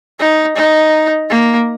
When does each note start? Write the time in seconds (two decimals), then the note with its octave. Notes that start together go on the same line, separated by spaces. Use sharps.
0.20 D#4
0.57 D#4
1.30 A#3